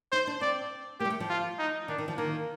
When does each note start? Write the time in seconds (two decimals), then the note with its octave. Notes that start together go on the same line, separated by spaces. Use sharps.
0.12 D#4 C5
0.27 D4
0.41 C4 D5
1.00 A#3 G4
1.05 G3
1.10 A3
1.20 F3
1.29 F4
1.59 D#4
1.88 D#3 D4
1.98 D#3
2.08 F3
2.17 D#3 A#3